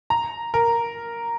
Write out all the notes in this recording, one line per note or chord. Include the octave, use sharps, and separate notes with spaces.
A#5
A#4